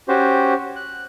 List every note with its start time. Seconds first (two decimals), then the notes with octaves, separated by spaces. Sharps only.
0.08 C#4 F#4 G4 C5
0.76 F#6